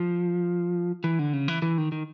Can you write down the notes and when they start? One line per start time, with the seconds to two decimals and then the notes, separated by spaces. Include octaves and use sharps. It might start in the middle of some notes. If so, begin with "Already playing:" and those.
Already playing: F3
1.04 E3
1.19 D3
1.33 C#3
1.48 E3
1.62 E3
1.78 D#3
1.92 D#3